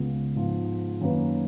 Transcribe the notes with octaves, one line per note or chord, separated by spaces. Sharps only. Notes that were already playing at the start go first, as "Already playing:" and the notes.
Already playing: C#2 C#3 G#3 B3 F4
G#2 F3 B3 F4
F#2 D#3 A#3 F4 B4